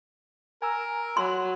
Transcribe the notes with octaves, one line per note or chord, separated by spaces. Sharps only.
A#4 G#5 A#5 E6
F#3 C6